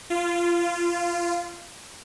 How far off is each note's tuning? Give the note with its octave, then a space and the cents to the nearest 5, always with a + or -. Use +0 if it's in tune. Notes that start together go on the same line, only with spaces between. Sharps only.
F4 -20